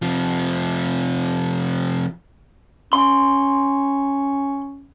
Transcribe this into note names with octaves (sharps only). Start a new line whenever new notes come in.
C3 F3
C#4 C6